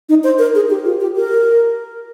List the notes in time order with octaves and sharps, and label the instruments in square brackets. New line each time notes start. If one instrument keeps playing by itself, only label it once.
[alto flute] D#4
C5
A#4
G#4
G4
F4
G4
A#4